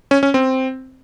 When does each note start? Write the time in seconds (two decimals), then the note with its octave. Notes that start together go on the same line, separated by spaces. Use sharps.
0.11 C#4
0.23 C#4
0.34 C4